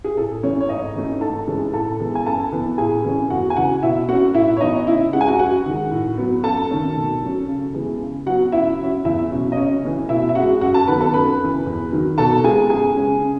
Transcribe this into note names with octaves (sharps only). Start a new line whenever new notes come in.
G#4
A2 A4
E3 A3 C#4 C#5
C#5
G#2 D#4 D#5
E3 A3 C#4
G#2 A4 A5
E3 G#3 C#4
A2 A4 A5
E3 G#3 B3
G#5
F#2 A4 A5
E3 B3
A2 G#4 G#5
E3 A3 C#4
E2 F#4 F#5
G#5
C#3 E3 F#4 F#5
B2 E4 E5
A3 C#4 F#4 F#5
A2 E4 E5
C#5
E3 B3 D#4 D#5
C#3 E4 E5
G#3 C#4 F#5
G#5
F#4 F#5
F#2 F#4 F#5
D#3 G#3
A2
F#3 B3
F#2 A4 A5
D#3 A3 C#4
B2
F#3 C#4
C#3
E3 G#3 B3
C#3
F#3 B3 F#4 F#5
C#3 E4 E5
F#3 C#4
E2 E4 E5
B2 F#3 C#4
D#5
C#3 C#4 C#5
E3 A3 C#4
B2 E4 E5
E5
G#3 C#4 F#4 F#5
F#2 F#4 F#5
A4 A5
D#3 F#3 B3 B4 B5
A4 A5
F#2 B4 B5
C#3 E3
E2
D#3 F#3
B2 A4 A5
G#3 B3 G#4 G#5
F#2 G#4 G#5
C#3 G#3 C#4
C#3